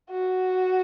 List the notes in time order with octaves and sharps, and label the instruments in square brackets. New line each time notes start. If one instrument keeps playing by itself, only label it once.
[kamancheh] F#4